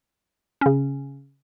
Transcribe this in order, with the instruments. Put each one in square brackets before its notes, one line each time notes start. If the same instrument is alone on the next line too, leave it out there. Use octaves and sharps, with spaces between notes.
[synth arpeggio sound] C#3 C#4